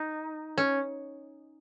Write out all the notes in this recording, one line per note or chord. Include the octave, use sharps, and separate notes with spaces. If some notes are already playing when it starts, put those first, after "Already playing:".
Already playing: D#4
C#4